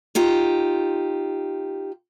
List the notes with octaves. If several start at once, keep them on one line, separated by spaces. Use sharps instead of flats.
D#4 F4 G4